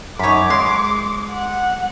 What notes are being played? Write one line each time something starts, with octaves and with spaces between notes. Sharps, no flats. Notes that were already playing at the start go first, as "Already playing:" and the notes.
F#2 D#4 C#5 B5 D6
G#3 A#5 C6
F#5